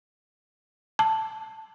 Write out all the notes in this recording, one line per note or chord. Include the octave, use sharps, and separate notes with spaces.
A5